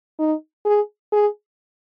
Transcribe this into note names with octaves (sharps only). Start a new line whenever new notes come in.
D#4
G#4
G#4